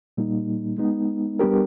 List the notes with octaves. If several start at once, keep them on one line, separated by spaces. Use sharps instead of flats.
A#2 G3 A#3 D#4
G#3 B3 D#4
G3 B3 D4 G4 A#4